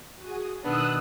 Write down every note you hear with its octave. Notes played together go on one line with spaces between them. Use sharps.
F#4 G#4 D#6
B2 D#3 B3 D4 D#4 D#6 E6 F#6